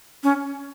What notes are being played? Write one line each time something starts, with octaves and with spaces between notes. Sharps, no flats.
C#4